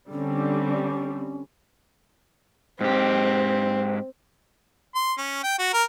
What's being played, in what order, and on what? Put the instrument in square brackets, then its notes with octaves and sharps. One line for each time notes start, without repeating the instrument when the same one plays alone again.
[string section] D3 G3 C4 [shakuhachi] C#4
[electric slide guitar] G#2 G4 [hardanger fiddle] C4
[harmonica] C6
C#4
G5
F#4
A#4